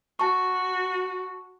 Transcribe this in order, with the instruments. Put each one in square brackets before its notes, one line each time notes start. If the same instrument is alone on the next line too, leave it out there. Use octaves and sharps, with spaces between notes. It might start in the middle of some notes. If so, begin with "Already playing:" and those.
[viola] F#4 [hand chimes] A5 C#6